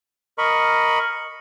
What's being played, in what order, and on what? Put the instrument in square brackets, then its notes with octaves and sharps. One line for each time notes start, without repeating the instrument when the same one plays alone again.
[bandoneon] A#4 D#5 B5 C#6